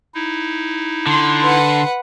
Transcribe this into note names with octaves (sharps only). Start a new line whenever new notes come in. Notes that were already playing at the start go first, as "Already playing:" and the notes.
D#4 E4
D3 C6
B4 F#5